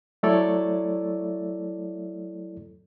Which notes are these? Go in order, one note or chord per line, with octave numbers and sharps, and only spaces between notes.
F#3 A3 E4 A4 C#5 D5